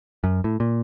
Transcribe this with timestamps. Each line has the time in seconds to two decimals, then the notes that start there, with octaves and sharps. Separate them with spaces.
0.24 F#2
0.44 A2
0.60 A#2